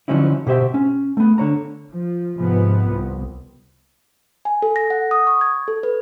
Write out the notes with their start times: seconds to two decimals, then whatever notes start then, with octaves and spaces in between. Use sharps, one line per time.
0.08 D3 F3 F#3 C#4 D#4 E4
0.47 B2 G4 C5 E5
0.74 C#4
1.17 A3 B3
1.38 D3 C#5 A#5
1.91 F3
2.37 G#2 C3 F3 B3
2.91 C2
4.45 G#5
4.62 A4
4.76 A#6
4.90 F#5
5.11 D#6
5.27 C#6
5.41 G#6
5.68 A4
5.83 B4